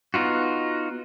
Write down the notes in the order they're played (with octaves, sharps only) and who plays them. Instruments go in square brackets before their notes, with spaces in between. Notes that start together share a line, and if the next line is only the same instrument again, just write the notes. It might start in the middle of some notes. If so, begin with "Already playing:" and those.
[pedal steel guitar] B3 D#4 F4 F#4